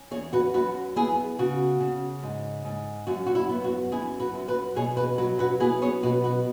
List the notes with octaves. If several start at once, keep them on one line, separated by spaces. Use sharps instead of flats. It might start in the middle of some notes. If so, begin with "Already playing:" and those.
Already playing: C#4
E2 G#4 C#5
F#4 B4
F#2 F#4 B4
B3 E4 G#4
C#3 F#4
C#3
G#2
G#2
F#2 F#4
F#4
E4
B3
F#4
F#2 E4 G#4
F#4 B4
F#2
F#4 B4
B2 G#4 C#5
F#4 B4
F#3 F#4 B4
F#4 B4
B3 E4 G#4
G#4 C#5
B2 F#4 B4
F#4 B4